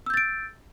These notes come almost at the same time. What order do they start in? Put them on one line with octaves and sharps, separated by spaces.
E6 G6 A6 D7